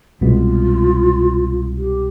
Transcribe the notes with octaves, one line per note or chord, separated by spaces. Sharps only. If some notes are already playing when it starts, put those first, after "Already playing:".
C2 B2 G#3 B3 F4
G4